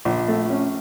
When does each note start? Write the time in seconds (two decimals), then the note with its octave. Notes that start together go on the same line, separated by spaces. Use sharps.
0.05 A#1
0.28 A3
0.50 C#4